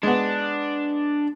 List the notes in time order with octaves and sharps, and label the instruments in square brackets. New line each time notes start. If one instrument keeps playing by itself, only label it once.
[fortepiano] G#3 B3 [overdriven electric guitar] D4